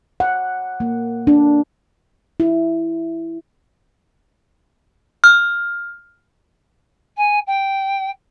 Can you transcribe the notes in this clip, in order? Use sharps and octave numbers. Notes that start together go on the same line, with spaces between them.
F#5
A#3
D4
E4
F6
G#5
G5